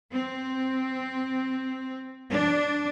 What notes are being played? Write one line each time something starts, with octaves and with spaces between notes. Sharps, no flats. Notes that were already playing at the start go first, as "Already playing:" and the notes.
C4
D4